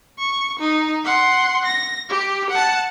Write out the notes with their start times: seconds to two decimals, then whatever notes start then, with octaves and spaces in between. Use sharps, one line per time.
0.18 C#6
0.60 D#4
1.05 F#5 C6
1.65 A#6
2.10 G4
2.50 F#5 A5